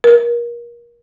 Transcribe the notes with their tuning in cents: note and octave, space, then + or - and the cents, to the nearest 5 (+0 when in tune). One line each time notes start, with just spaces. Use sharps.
A#4 +30